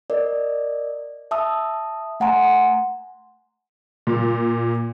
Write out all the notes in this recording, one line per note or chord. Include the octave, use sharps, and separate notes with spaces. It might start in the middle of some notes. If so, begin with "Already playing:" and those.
A#4 D5 D#5
E5 A5 D#6 E6
A3 F#5 G#5 A#5 C6
A#2